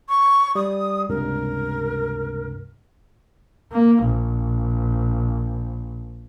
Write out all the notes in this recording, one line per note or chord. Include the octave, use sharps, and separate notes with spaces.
C#6
G3 D#6
C#2 G2 C3 A#4
A#3
A#1